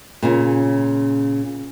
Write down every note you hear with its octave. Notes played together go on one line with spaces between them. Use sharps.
A#2 C#3 C#4